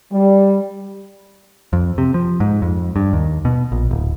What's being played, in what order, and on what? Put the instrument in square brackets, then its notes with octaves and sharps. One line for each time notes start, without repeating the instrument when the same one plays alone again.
[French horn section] G3
[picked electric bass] F2
C3
F3
G#2
F2
G2
D#2
B2
A#1
D1